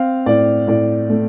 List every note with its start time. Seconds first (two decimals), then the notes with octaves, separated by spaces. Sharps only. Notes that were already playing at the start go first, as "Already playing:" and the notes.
Already playing: C4 F5
0.26 A2 D5
0.68 A2 D5
1.10 A3